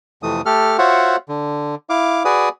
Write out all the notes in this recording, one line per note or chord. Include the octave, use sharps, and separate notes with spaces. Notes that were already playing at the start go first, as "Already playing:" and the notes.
F2 C3 E3 A3 D#6
A3 G4 A4 F6
F4 F#4 C5 C#5 E5 F#5
D3
E4 F5 D6
F#4 G#4 B4 D5 D#6